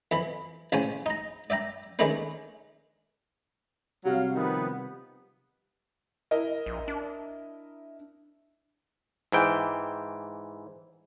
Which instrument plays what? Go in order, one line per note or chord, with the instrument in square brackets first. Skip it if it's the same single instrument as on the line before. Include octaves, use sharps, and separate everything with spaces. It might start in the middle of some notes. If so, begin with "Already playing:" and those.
[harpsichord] F2 E3 B5
A1 C#3 C#4 C5 G5 G#5
D#4 A#5
D5 E5 G5 A#5
D#3 G#3 A3 C#4 D4 B4
[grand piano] C3 G3 [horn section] F#3 F5
[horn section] D#3 F3 B3
[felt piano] E4 A#4 D#5
[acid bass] A#1
D4
[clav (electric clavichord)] G#2 E3 G5